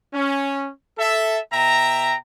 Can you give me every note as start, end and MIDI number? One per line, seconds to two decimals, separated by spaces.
0.14 0.69 61
0.99 1.39 69
0.99 1.39 76
1.53 2.16 47
1.53 2.16 76
1.53 2.16 79
1.53 2.16 82